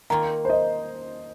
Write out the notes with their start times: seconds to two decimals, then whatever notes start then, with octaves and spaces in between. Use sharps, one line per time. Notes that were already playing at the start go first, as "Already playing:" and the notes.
0.10 D#3 A#3 F4 A#5
0.45 C5
0.50 D#5